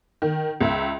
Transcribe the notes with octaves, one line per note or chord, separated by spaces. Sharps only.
D#3
C#2 E5